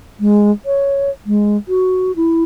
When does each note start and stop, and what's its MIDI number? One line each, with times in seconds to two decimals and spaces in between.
0.20 0.52 56
0.66 1.11 73
1.26 1.57 56
1.68 2.15 66
2.16 2.44 64